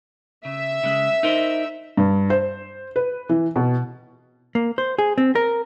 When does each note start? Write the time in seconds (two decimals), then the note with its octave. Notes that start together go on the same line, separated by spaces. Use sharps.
0.45 C#3 E5
0.83 C#3 G#3
1.23 D#4 A#4 C5
1.97 G2
2.30 C5
2.96 B4
3.29 E3
3.56 B2
4.55 A#3
4.78 C5
4.98 G#4
5.18 C4
5.35 A#4